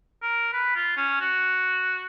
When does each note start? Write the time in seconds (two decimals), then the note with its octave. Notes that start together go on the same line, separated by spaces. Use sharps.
0.23 A#4
0.53 B4
0.76 F4
0.97 C#4
1.20 F#4